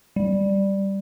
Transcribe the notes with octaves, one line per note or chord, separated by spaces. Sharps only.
G3